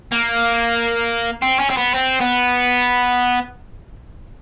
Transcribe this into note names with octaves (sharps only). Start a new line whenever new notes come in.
A#3
C4
C#4
C4
B3
C4
B3